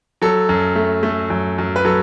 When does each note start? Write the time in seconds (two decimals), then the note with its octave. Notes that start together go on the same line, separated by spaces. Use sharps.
0.22 F#3 A4
0.49 F#2
0.76 A3
1.03 A3
1.30 F#2
1.58 F#2
1.76 B4
1.85 F#3 A4